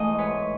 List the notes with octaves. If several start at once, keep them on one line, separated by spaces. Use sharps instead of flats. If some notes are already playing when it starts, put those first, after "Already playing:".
Already playing: G#2 E3 A3 D#5
B4 C#5